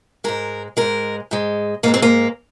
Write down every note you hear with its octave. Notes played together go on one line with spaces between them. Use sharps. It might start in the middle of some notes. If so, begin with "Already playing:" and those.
G#2 G#3 A#4
G#2 G#3 A#4
G#2 G#3
G#2 G#3 A#3
C4
A#3